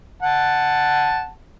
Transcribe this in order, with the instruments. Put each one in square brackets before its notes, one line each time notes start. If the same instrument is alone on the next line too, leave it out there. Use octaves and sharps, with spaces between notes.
[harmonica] F#5 A5